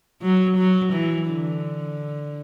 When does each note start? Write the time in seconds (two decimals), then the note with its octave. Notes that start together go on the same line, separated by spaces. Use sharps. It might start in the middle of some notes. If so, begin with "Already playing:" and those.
0.22 F#3
0.57 F#3
0.93 E3
1.30 D3